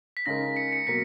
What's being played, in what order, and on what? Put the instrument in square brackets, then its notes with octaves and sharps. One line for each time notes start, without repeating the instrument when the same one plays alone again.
[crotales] B6
[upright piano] C#3 G#3 D#4 A#4 [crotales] A#6
[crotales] C#7
C#7
[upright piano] B2 F#3 A#3 [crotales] B6